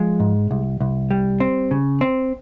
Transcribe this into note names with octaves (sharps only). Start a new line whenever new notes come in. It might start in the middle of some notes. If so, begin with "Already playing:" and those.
Already playing: F3 G#3
G#2
C2
C2
G3
C4
C#3
C4